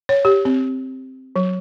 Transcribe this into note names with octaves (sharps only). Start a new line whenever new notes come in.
C#5
G4
C4
F#3